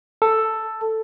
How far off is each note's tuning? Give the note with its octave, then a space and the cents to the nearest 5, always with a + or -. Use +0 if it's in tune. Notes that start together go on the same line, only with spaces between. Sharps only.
A4 +5